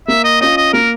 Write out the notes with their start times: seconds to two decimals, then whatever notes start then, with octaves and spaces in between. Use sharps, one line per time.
0.08 A#3 E5
0.25 D#5
0.41 C#4 F4 D#5
0.57 D#5
0.73 A#3 A#4